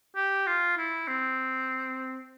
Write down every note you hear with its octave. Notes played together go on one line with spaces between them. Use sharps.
G4
F4
E4
C4